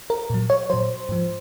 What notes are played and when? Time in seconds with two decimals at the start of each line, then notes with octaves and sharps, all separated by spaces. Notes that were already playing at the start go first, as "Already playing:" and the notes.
0.10 A#4
0.30 A#2 F#3
0.50 C#5
0.70 A#2 F#3 C5
1.09 G#2 F3